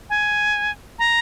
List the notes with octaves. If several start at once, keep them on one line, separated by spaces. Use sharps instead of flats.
G#5
A#5